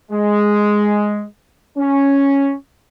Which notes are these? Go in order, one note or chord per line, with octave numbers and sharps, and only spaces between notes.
G#3
C#4